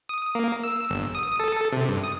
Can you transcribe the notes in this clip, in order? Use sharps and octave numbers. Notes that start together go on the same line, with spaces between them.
D#6
A#3
E6
G1
D#6
A4
C3
G2
D#6